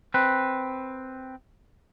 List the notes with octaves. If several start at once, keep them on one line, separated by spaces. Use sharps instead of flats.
C4 B4